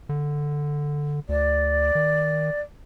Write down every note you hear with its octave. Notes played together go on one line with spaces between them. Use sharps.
D3
D2 D5
D#3